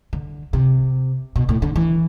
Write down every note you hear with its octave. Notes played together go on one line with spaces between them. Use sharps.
D3
C3
B2
A2
D3
E3